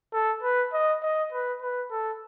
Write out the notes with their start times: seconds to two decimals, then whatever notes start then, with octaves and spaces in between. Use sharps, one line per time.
0.13 A4
0.43 B4
0.73 D#5
1.02 D#5
1.32 B4
1.62 B4
1.91 A4